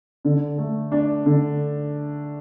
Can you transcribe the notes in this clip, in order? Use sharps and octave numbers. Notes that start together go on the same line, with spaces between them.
D3
A3
D4
D3